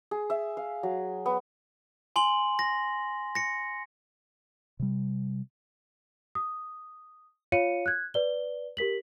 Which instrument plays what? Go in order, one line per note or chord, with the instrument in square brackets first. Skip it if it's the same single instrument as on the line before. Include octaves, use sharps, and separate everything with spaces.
[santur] G#4
E5
F5
F#3
B3
[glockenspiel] G#5 C6 F#7
A#6
A#6 C#7
[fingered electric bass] C3 G3
[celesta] D#6
F4 C#5 F5 C#7 D#7
F#6 G#6
B4 D5 G7
G4 A#4 B6 F#7